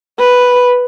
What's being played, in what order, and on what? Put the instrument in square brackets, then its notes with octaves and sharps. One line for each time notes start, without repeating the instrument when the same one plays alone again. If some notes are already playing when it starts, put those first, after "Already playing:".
[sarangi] B4